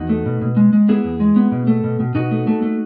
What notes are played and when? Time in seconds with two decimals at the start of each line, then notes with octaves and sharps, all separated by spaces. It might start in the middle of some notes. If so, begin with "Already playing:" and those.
Already playing: E2 D#4 F#4
0.09 A3
0.26 B2
0.41 B2
0.57 G#3
0.73 G#3
0.88 B3 E4 G#4
1.04 E2
1.20 G#3
1.36 B3
1.52 B2
1.67 A3
1.84 B2
2.00 B2
2.15 B2 D#4 F#4
2.31 A3
2.47 A3
2.63 A3